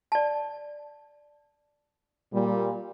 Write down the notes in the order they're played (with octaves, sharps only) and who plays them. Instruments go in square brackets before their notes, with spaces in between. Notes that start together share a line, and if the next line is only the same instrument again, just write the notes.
[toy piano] D5 A5
[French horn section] A#2 G3